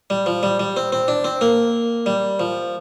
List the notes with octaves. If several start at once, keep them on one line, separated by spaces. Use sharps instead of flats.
G3
F3
G3
G3
C4
C4
D4
C4
A#3
G3
F3